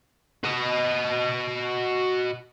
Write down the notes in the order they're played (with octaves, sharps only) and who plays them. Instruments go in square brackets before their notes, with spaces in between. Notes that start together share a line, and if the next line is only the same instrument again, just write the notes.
[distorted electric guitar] F#4 D#5